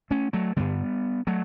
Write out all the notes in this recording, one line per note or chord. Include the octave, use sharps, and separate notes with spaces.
A3 C#4
F#3 A3
G2 D3 G3 B3
F#3 A3